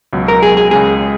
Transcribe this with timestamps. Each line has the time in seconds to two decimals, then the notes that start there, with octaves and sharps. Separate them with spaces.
0.13 C#2 B2 F#3
0.28 A#4
0.43 G#4
0.57 G#4
0.71 C#2 C#3 G#3 G#4